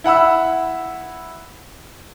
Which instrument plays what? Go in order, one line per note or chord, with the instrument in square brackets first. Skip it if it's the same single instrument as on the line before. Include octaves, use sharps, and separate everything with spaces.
[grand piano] E4 F#5 B5 E6